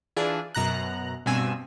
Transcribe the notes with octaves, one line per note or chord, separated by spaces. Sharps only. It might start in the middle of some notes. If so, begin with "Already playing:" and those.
E3 D4 F4 G#4
F#2 B2 A#5 F#6
G2 B2 C4 G#5 E6